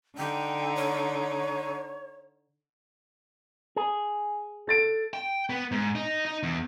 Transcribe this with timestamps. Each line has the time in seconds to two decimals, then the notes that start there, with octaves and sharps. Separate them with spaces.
0.17 D3 D#4 G5
0.76 C#5
3.76 G#4
4.67 A4 A6 D7
5.14 G5
5.50 B3
5.71 G#2
5.95 D#4
6.26 D#4
6.43 E2